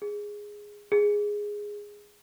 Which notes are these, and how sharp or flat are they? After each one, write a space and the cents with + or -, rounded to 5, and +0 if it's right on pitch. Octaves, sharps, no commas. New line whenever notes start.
G#4 -5
G#4 -5